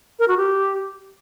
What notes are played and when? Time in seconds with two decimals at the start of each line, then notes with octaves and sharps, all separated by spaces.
0.19 A#4
0.28 F#4
0.37 G4